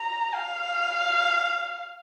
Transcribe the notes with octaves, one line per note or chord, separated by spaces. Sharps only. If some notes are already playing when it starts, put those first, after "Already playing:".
Already playing: A#5
F5